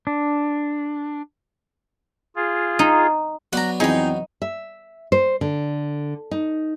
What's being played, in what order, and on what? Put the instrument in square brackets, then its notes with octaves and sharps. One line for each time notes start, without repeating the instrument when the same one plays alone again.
[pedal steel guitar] D4
[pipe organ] F4 G#4
[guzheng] D#4
[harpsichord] F#3 B3 D4 [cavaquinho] F#5 A#5
[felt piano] F2 E3 C4 [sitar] D#4 [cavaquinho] G#4 G5
[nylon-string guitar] E5
C5
D3
D#4